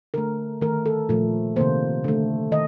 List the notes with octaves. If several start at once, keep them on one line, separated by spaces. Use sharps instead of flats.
D3 A3 A#4
D#3 A3 A#4
A4
A#2 F3 A3
C3 D#3 A#3 C5
D3 A3
D#3 D#5